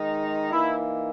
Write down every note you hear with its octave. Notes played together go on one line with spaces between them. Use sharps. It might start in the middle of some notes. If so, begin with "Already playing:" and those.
Already playing: D#3 G#3 D#4
E3 A#3 D#4 E4